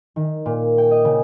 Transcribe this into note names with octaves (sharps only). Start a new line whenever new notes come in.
D#3
A#2
G5
D#5
C#3